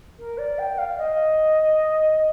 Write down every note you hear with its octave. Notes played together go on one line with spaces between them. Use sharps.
A#4
D5
G5
F5
D#5